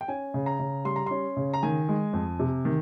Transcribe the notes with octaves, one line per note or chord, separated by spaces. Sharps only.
G5
C#4 G#5
C#3
A#5
C#3
G3 C6
A#5
C#4 C6
C#3
A#5
D#3 G#5
G#3
F2
C3
D#3